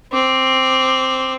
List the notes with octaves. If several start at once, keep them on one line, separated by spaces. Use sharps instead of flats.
C4 D6